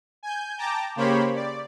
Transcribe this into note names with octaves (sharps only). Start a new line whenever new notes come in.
G#5 G6
G5 A5 A#5 D6
C#3 A#3 G4 C5 C#5 B5
D5